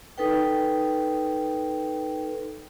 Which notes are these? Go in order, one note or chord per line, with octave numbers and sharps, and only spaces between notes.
D#4 A4 B4 G5